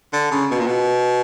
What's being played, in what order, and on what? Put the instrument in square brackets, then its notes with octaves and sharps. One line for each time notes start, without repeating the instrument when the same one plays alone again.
[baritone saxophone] D3
C#3
B2
A#2
B2